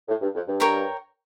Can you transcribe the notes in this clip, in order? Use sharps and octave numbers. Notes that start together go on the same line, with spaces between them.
A2
G2
F2
G2
A#4 C#5 G5 A#5